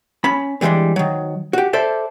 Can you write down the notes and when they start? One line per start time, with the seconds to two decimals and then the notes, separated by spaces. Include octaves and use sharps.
0.24 C#4 B5
0.61 D3 E3 G3 G#3 D4
0.96 D#3 F#3
1.53 F#4 G4
1.73 A4 C5 D5 E5